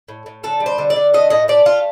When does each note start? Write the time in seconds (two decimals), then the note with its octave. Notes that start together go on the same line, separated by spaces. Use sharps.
0.08 A2
0.26 A2
0.43 D3 A4
0.60 G3
0.66 C5
0.78 D3
0.90 D5
0.96 D3
1.14 A3 D#5
1.30 A2 D#5
1.48 A3 D5
1.65 A3 F4